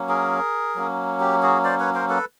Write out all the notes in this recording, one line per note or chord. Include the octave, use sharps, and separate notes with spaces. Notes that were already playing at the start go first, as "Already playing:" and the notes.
Already playing: F#3 A#3 C#4
G#4 A#4
F#3 A#3 C#4
G4
F#4 G#4
C5 D5
B4 C#5
A#4 C5
A4 B4